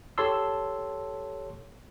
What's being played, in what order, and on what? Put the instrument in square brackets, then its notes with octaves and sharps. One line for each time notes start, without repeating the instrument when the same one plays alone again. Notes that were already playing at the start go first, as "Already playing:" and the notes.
[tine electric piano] G4 A4 C#5 A5 C6 E6